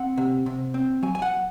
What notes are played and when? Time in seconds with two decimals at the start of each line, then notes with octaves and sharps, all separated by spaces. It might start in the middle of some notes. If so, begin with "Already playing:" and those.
Already playing: C4 F#5
0.17 C3
0.46 C3
0.74 C4
1.03 F#3 G#5
1.15 G#5
1.22 F#5